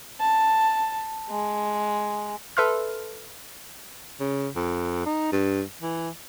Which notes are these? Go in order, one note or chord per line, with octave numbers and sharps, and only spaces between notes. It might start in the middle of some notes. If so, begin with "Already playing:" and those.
A5
G#3
A4 B4 E5 C6 F6
C#3
F2
D#4
G2
E3